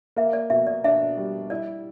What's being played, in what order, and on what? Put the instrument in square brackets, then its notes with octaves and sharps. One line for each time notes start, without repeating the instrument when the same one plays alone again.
[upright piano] A#3 [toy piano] E5
[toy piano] D5
[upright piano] B2 [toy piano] E5
[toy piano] D5
[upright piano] D4 [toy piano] E5
[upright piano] G3
[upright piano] E4 [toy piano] D5